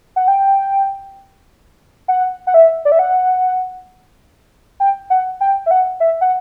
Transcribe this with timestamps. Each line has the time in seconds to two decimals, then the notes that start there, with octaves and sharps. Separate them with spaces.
0.16 F#5
0.28 G5
2.08 F#5
2.47 F#5
2.54 E5
2.85 D5
2.92 E5
2.99 F#5
4.80 G5
5.10 F#5
5.41 G5
5.66 E5
5.71 F#5
6.00 E5
6.21 F#5